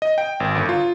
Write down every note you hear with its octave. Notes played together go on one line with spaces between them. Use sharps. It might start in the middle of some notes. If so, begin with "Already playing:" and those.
D#5
G5
G#1
G1
F4